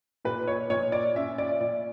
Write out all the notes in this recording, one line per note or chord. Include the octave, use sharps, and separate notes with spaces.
A#2 B4
C#5
A#2 C#5
D5
C#4 E5
D5
A#2 D5